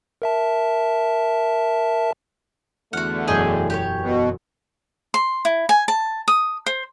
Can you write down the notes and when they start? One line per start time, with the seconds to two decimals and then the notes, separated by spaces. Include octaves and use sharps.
0.22 A#4 E5 A5
2.93 E2 D3 A3 F#4 F#5 F6
3.28 E1 F#2 G#4 D#5 G5 G#5
3.70 G4 B4 C#5
4.01 B2
5.14 C6
5.45 E4
5.69 G#5
5.88 A5
6.28 D#6
6.66 C5